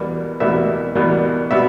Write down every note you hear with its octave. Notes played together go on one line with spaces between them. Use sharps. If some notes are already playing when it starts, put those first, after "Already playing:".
Already playing: E2 B2 G3 A#3
E2 B2 G3 A#3 E5
E2 B2 G3 A#3
B2 G3 E5